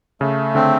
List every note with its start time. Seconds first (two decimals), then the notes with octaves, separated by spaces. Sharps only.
0.21 C#3 A3
0.55 D3 C4